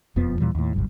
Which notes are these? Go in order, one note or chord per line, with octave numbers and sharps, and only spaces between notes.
E1 F2 F3 B3
D#2 A#2 E3 G3
D#2 A2
F#1 B1 G2